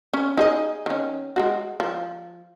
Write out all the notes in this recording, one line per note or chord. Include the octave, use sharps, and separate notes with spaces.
C#4
D#4 G#4 D#5
D#3 C#4
G#3 F4 F#4
F3